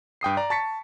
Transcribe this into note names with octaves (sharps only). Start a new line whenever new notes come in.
G2 G5 D#6 C7
D5 A#5
A5 C#6 A6 B6 C#7